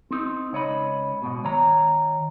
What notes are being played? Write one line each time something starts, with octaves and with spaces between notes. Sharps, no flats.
C4 D#4
C#2 C#5 D#5 B5
G#2 B2
D#3 C#5 A#5